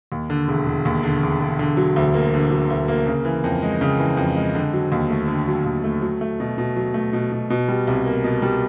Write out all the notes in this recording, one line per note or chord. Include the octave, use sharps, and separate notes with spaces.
D#2
D3
E1
E1
D#2
D3
E1
E1
D3
F#3
D2
A#3
D3
F#3
D2
A#3
C#3
E3
F2
G#3
C#3
E3
F2
G#3
D3
F#3
D#2
A3
D3
F#3
D#2
A3
F#3
A3
B2
B2
F#3
A3
B2
B2
B2
G3
C2
A#3
B2
G3